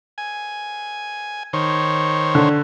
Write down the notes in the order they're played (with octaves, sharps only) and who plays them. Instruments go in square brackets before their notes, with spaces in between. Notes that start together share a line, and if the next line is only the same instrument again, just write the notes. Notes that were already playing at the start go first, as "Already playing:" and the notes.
[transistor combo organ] G#5
D#3 C5 C#5
[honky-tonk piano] D3